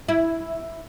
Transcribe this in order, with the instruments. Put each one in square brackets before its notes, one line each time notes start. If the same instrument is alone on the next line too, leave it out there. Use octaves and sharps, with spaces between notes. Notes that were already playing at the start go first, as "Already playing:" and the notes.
[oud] E4